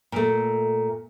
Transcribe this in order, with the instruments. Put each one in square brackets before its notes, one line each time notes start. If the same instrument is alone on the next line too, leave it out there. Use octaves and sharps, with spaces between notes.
[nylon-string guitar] A#2 A3